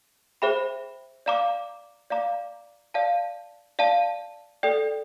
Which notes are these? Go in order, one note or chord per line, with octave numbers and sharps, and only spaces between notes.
G#4 C5 E5 G5 B5
D5 F5 A#5 D6
D5 F5 A#5 D6
D5 F5 A5
D5 F5 A5
A4 D5 G5